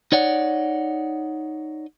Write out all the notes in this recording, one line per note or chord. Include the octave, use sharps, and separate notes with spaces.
D#4 C#5 D5 F#5